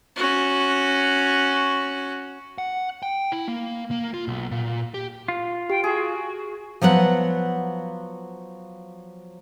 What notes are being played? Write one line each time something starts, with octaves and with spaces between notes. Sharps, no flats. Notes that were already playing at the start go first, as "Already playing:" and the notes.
C#4 F#4
F#5
G5
E4
A#3
A#3
F4
B1
A#2
G4
F4
G4 G5
F#4 G#4
F3 F#3 B3 F#5